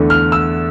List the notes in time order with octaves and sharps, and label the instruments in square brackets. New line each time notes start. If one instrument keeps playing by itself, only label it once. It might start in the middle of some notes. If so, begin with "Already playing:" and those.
Already playing: [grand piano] E2 D3 A3 D4
F6
E6